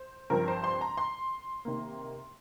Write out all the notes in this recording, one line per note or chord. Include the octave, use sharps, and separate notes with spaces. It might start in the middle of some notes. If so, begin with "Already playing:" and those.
Already playing: C5
G2 F3 C4 A#4
C5
C6
A#5
C6
C3 D#3 A#3